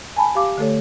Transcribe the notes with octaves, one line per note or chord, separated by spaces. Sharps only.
G#5 A5 B5
G4 F5 D6
D3 A3 A4 C#5